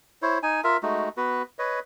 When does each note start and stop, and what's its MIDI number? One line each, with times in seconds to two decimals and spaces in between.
0.22 0.38 64
0.22 0.38 72
0.22 0.38 73
0.43 0.61 63
0.43 0.61 80
0.64 0.77 65
0.64 0.77 70
0.64 0.77 76
0.83 1.09 56
0.83 1.09 57
0.83 1.09 63
0.83 1.09 66
1.17 1.42 59
1.17 1.42 66
1.17 1.42 71
1.59 1.80 71
1.59 1.80 73
1.59 1.80 75